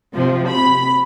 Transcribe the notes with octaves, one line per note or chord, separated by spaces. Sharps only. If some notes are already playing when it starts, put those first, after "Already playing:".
C3 F3
B5